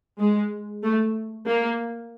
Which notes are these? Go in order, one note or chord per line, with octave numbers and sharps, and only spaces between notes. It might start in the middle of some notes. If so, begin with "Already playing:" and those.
G#3
A3
A#3